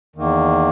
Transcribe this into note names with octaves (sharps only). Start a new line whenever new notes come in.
E2 D#3 A#3